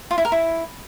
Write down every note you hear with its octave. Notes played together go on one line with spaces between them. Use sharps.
F4
E4
A#4
E4